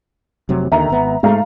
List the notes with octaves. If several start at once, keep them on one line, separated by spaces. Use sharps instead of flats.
F1 C3 F#3
D#2 D3 D#3 E5 A#5
G#1 B3
G#2 G#3 A3 F5 A#5